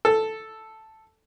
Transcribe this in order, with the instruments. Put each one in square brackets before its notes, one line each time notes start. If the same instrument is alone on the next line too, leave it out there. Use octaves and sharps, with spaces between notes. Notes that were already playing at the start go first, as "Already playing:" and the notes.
[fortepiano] A4